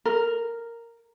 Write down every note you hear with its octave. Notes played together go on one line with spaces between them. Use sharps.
A#4